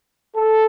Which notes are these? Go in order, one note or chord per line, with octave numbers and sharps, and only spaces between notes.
A4